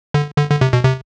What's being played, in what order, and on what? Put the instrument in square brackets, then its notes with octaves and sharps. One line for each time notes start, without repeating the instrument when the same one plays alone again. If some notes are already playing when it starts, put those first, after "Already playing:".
[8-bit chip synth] D3
D3
D3
C3
B2
C3